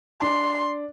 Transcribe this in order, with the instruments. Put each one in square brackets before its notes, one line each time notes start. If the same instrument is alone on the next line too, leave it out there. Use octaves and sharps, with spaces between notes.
[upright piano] D4 [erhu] C6